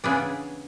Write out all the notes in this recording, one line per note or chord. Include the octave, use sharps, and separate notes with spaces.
C#3 E3 B3 D4 G#4